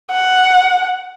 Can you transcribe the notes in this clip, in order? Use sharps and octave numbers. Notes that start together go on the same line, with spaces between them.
F#5